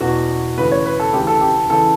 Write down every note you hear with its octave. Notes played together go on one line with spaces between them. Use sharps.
E2 B2 F#4
D2 C#3 E3 B4
C#5
B4
A4
D2 C#3 E3 G4
A4
G4
C#3 E3 A4